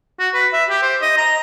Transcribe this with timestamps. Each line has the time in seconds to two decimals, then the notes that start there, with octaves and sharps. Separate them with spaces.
0.19 F#4
0.34 B4
0.53 E5
0.69 G4
0.82 C5
1.02 D#5
1.18 A#5